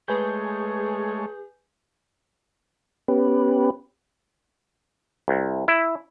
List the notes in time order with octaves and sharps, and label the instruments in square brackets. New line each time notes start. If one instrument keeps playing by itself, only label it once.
[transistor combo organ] G#3 A3 C#5 [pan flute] G#4 [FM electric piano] B4 G#5 G6
[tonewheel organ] B3 C#4 G4 B4
[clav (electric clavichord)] C2
E4